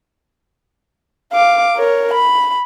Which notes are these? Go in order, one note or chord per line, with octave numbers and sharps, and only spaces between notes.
F5 D6
A#4 C#5
B5